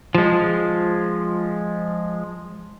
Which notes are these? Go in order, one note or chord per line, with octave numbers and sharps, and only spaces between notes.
F3 G#3